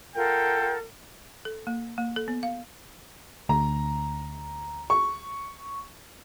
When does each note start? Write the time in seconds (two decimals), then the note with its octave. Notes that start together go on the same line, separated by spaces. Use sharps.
0.16 F4 A4 A#4 F#5 G5
1.45 A4
1.67 A#3
1.98 A#3
2.16 A4
2.28 B3
2.43 F5
3.49 D2 A#5
4.90 C#6